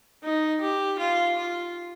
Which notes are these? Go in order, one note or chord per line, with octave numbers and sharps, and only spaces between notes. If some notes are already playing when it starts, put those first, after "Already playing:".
D#4
G4
F4
F4